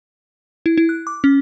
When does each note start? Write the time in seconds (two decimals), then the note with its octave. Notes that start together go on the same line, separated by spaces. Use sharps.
0.66 E4
0.78 E4
0.89 F#6
1.07 D6
1.24 C#4